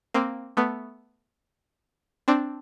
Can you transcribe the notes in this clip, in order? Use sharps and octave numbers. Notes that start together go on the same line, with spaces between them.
A#3 C4
A3 B3
C4 D4